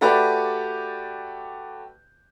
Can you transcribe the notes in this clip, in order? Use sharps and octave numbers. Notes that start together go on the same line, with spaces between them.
A3 F#4 G4 B4 D5